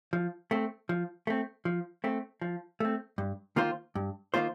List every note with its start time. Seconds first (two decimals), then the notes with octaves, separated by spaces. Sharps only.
0.13 F3
0.51 A3 C4
0.89 F3
1.27 A3 C4
1.65 F3
2.04 A3 C4
2.41 F3
2.80 A3 C4
3.18 G2
3.56 D#3 A#3 F4 C5
3.95 G2
4.34 D#3 A#3 F4 C5